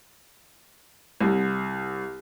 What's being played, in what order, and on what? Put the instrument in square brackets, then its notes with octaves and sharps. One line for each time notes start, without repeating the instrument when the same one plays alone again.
[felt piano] C2